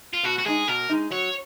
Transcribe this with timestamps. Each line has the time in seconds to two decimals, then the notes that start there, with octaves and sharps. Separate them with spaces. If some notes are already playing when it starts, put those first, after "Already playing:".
0.13 F4
0.23 B2 F#4
0.38 F#4
0.46 G#3 D#4 G#4
0.68 B2 A#4
0.89 G#3 D#4
1.11 F#3 C#5